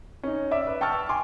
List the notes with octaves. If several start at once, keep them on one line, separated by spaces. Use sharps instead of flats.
C#4 D#4
D5 E5 D6
B4
G5 A5 C#6 E6 F6 A6
G#5 C6 D6